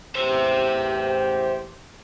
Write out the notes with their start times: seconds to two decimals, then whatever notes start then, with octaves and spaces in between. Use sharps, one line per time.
0.15 A1 E2 G4 C5 E5